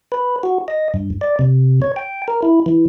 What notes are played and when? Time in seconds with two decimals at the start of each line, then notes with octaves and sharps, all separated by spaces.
0.12 B4
0.43 F#4
0.68 D#5
0.94 G2
1.21 D5
1.39 C3
1.82 C#5
1.96 G5
2.28 A#4
2.43 E4
2.66 E3